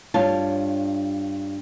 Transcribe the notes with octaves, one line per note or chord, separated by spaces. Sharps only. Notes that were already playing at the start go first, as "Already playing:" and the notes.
G2 F4 C#5 A5